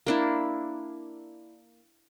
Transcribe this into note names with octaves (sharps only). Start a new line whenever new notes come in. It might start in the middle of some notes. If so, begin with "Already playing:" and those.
A#3 D4 E4